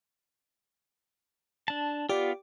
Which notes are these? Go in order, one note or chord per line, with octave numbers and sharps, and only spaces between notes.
D4 A5
B3 F4 G4 D5